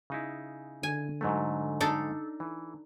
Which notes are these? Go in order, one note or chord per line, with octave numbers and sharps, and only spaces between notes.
C#3 D#4 E4
D3 G#5
G#2 F#3 A3
D4 D#4 A4
E3